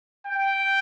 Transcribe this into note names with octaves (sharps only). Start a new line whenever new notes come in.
G5